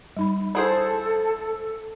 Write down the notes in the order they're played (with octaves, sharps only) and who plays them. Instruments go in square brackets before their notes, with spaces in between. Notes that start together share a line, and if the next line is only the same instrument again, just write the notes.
[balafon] G3 D#4 B5
[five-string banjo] E4 G#4 C5 [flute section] A4